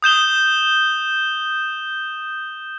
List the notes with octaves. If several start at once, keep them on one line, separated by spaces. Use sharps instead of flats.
D#6 G6 E7 G7